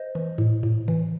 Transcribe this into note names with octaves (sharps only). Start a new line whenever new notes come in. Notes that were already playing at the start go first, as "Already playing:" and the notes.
Already playing: C5 D#5
E3
A2
A2
E3